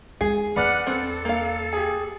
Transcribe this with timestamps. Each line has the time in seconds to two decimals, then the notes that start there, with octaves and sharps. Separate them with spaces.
0.21 G#3 D#4 G#4
0.56 E2 B4 D5 F#5 F6
0.87 C4 A4
1.25 A#3 F5
1.73 G4 G#4